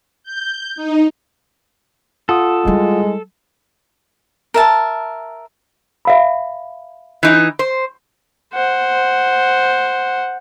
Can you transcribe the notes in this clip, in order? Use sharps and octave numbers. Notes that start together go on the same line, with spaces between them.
G6
D#4
F4 A4 F#5 D#6
G3 G#3 E4
A#4 E5 A5
E5 F5 B5
E3 D#4
C5
C5 F#5